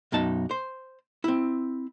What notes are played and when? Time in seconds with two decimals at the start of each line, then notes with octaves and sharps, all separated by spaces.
0.12 B1 F#2 B3 D#4 A5
0.51 C5
1.24 C4 E4